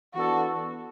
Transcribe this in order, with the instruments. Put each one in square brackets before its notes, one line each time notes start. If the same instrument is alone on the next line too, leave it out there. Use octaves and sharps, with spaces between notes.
[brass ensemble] E3 B3 D4 A4 [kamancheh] F#4